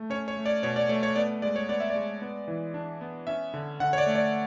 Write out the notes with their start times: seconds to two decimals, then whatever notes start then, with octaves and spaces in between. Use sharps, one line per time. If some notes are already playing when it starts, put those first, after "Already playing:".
Already playing: A3
0.10 C#4 C#5
0.28 C#5
0.37 A3
0.46 D5
0.63 B2 C#5
0.76 D5
0.89 A3 C#5
1.03 C#5
1.16 B3 D5
1.42 G#3 D5
1.56 C#5
1.69 B3 D5
1.80 E5
1.90 D5
1.96 G#3
2.22 B3
2.48 E3
2.74 D4
3.01 B3
3.27 C#4 E5
3.54 D3
3.80 D3 F#5
3.93 C#5
3.98 D5
4.06 A3
4.15 D5